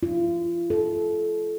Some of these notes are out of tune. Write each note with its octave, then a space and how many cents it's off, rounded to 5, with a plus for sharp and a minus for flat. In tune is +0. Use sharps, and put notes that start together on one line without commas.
F4 -35
A4 -25